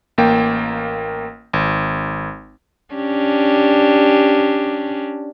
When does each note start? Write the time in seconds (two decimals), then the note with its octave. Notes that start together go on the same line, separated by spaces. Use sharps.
0.18 A1 A#3 G5
1.53 G#1
2.94 C#4 D4 G4